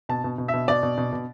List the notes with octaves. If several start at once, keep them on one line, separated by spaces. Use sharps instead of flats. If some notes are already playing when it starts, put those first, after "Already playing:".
B2 A5
B2
B2
E5
B2
B2 D5
B2
B2
B2